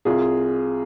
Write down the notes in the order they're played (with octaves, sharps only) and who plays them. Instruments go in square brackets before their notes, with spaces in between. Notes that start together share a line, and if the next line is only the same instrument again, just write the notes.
[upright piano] C2 F4 G#4